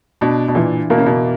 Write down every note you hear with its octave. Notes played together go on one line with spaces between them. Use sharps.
B2 D4
B2
A#2 E3
B2 A#3
C#3
B2